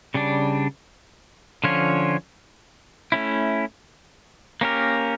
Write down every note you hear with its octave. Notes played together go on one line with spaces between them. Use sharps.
C#3 G3 D4
D3 F3 C#4 F4 C#5
A3 C#4 E4
A#3 C#4 G4 A#4